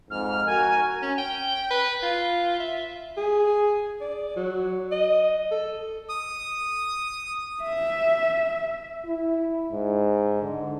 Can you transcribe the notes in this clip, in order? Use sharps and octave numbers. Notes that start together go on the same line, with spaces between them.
F2 G#2 F6
F#4 A#4 G#5
C#4
G5
B4
F4
E5
G#4
D5
F#3
D#5
A4
D#6
E5
E4
G#2
D3